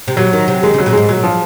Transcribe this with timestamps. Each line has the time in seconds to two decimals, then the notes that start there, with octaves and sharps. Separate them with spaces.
0.08 C3
0.17 A#2 F#3
0.33 D#3
0.48 C3
0.63 D#3 G#3
0.74 C#3
0.78 F#3
0.86 A#2
0.93 G#2 G#3
1.09 A#2 F#3
1.24 F3